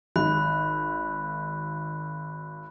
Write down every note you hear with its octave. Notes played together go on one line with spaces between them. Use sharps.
G#1 B5 F#6